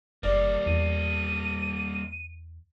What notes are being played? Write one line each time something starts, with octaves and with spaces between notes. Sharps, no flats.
F#1 G3 A#3 D5
E2 D#7